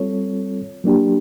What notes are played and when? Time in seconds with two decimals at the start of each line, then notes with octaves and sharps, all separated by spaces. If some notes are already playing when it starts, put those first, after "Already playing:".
Already playing: G3 C4 F4 A4 C#5
0.84 F#3 A#3 D4 G4